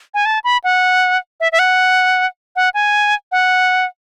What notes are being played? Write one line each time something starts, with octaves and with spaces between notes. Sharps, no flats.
G#5
A5
B5
F#5
E5
E5
F#5
F#5
G#5
F#5